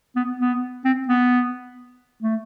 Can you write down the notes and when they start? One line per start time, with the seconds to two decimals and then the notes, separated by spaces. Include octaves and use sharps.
0.16 B3
0.40 B3
0.85 C4
1.08 B3
2.22 A3